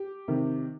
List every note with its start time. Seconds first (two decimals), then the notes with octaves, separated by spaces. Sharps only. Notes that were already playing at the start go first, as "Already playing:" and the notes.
Already playing: G4
0.28 C3 D#3